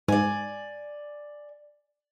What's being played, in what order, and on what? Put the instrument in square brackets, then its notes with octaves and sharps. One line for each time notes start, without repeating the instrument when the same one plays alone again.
[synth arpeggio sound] G#2 [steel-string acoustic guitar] D5 G#5